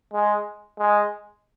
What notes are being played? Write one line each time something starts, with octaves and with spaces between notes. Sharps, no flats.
G#3
G#3